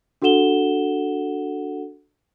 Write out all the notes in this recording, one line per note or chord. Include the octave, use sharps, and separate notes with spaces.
D4 F#4 A4 F#5 E7 G7